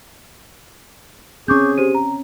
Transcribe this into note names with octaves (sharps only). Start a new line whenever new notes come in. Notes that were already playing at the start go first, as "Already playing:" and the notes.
C4 C#4 G#4 C#6 D6 G6
G4 C5 D#7
A#5